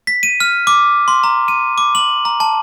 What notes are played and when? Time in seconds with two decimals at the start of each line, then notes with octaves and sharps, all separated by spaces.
0.07 B6
0.23 D#7
0.40 F6
0.67 D6
1.08 C6
1.24 A#5
1.48 D#7
1.78 D6
1.95 F#7
2.25 A#5
2.40 A5